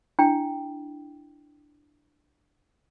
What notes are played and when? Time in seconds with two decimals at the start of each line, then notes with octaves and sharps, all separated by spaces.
0.19 D4 E4 G5